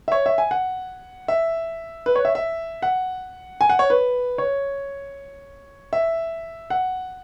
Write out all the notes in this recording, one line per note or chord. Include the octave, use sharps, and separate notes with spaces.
E5
C#5
E5
G#5
F#5
E5
B4
C#5
E5
E5
F#5
G#5
F#5
C#5
B4
C#5
E5
F#5